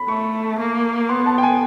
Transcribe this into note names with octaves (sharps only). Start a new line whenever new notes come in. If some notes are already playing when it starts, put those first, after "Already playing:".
Already playing: B5
A3 C#6
A#3
B3 C6
A5
G5
G#5